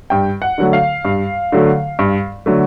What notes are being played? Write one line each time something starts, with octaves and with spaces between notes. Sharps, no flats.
G2 G5
F#5
D3 F#3 A3
F5
G2
D3 F#3 A3
G2
D3 F#3 A3